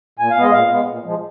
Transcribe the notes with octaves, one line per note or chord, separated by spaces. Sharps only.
A#2 G#5
F5
G#3 B3 D#5
A#2 F5
G#3 B3
A#2
F3 G#3